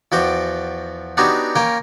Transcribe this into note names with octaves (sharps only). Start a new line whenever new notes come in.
E2 F3 F#4 G5 D6
B3 D4 D#4 F#4 G4 C#5
A#3 C#4 A#4 G5